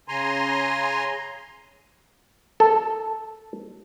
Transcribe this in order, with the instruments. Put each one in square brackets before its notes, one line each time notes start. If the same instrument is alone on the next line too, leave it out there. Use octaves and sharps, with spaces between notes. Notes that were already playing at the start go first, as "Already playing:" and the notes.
[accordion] C#3 G#5 A#5 C6
[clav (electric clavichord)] A4